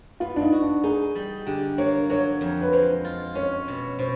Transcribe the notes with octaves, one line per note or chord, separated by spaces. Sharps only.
B3 F4
D4
D#4
F#4
D4
D#4 G#4
G3
D3 G4
A#3 C#5
F#3 C#5
F2
B4
G#3 C5
F4
C#4 C#5
B2
B2 C5